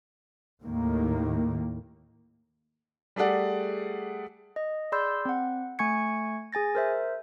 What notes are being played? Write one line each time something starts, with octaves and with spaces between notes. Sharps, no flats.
D#2 A2 D#3 A#3
G3 A3 G#4 D5 F#5
D#5
G#4 D5 B5 C6 E6 G6
C4 F#5
A3 G#5 C#6 G#6 C#7
G#4 G#5 A6 A#6
A#4 C5 E5